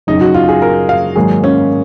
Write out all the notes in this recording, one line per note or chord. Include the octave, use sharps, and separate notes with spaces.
F#2 C#3 F#3 D#4
F#4
F4
G#4
A#4
F5
G#2 D#3 F#3 A#3 G#4
C#4